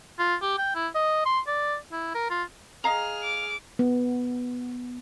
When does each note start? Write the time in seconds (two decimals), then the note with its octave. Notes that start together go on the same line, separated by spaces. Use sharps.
0.19 F4
0.42 G4
0.58 G5
0.75 E4
0.95 D#5
1.26 C6
1.47 D5
1.92 E4
2.15 A#4
2.30 F4
2.84 G#4 D#5 F5 A#5 F6
3.24 D6
3.79 B3